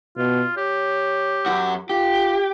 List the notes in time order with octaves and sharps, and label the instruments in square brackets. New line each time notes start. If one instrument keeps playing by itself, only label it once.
[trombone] B2 [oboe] F4
[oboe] G4 [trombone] C#5
[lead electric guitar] F#2 F#4
[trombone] F4 [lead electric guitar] G4